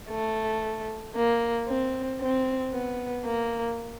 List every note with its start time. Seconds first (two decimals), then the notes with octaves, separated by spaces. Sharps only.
0.10 A3
1.15 A#3
1.68 C4
2.21 C4
2.73 B3
3.25 A#3